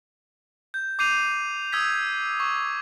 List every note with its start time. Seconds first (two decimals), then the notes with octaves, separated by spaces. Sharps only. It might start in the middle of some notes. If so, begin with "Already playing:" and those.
0.74 G6
0.99 D6 G6 C7 D#7 F7
1.72 D#6 E6 G#6 B6
2.40 C#6